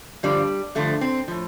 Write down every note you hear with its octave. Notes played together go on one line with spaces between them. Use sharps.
G2 D3 F3 G3
G2 D3 F3 A3
C4
A2 F3